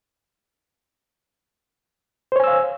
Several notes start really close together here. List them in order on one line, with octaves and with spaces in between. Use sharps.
C5 C#5 G#5 E6 F5